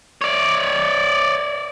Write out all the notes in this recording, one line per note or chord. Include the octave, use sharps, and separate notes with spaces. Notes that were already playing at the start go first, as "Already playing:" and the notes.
C#5 D5